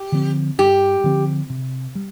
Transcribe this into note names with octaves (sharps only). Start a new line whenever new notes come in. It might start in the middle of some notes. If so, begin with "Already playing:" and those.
Already playing: G4
D3 F3 C4
G2 G4
D3 F3 C4
C3
G3